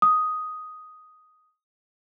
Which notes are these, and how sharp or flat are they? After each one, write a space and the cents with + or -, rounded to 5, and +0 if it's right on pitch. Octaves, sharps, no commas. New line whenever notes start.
D#6 +5